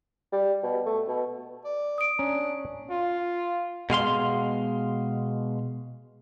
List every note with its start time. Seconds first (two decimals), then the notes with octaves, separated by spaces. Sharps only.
0.32 G3
0.63 B2
0.86 A3
1.08 B2
1.65 D5
1.98 D#6 D7
2.19 C#4 D4 A#5
2.90 F4
3.90 B2 G#3 F5 C6